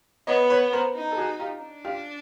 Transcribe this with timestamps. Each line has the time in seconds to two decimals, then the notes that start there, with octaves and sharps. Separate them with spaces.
0.27 B3 C#5 D#5
0.50 B4 C#5
0.73 A#4 C5
0.95 D#4
1.11 A4
1.17 F#4 G#4
1.40 F4 G4
1.62 D4
1.85 F4 G4